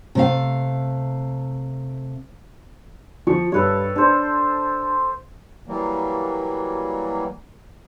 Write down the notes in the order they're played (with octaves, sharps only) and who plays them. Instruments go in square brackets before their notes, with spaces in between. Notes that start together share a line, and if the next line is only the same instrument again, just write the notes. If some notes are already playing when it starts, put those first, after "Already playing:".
[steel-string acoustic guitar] C3 A3 F5
[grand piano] F3 [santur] C#6
[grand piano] G2 [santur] A4 B4 C#5
[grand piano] D4 [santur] A4 C5
[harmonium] E3 F#3 G3 A#3